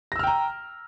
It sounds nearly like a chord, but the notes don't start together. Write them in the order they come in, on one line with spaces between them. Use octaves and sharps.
A#6 E6 F6 G5 A#5